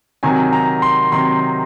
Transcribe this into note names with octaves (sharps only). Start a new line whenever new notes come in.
C3 D#3 F#3 G#5
A#5
C6
C3 D#3 F#3 C6